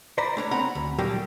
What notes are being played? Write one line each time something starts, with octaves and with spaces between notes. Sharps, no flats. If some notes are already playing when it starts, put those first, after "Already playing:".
C5 D5 A#5 B5
A3 D4 C#5
C4 F#5 A#5 B5
D2
A#2 F#3 G3 A#3 G4 A4